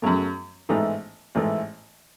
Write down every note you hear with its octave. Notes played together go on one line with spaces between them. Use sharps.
F#2 C#3 F#3 A3
A1 G#2 E3 A3 D#4
A1 G#2 E3 A3